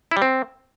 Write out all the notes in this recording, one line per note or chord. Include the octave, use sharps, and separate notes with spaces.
E4
G3
C4